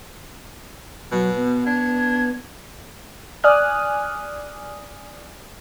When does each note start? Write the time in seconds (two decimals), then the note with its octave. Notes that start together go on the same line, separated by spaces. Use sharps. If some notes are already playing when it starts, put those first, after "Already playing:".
1.12 B2 F#3
1.36 B3
1.66 D4 G#6
3.44 D5 G#5 D#6 F6 F#6